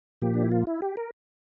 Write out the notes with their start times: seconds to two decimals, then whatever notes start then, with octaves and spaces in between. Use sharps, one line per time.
0.22 A#2 F3 A#3 G4
0.34 D4
0.43 E4
0.52 F4
0.67 E4
0.82 G4
0.97 A#4